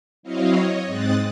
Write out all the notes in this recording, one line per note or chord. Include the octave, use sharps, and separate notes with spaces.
F#3 C4 E4 C#5 D#5 F5
C#5 D#5
G#2 G#3 C4 D#6 F#6 A6